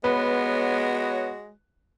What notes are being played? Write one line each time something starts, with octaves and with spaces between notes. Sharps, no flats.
G#3 B3 F#4 B4 C#5